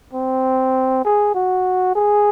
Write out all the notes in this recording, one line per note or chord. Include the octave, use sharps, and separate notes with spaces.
C4
G#4
F#4
G#4